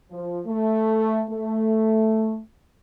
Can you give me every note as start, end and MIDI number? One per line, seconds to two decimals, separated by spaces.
0.11 0.41 53
0.47 1.24 57
1.30 2.40 57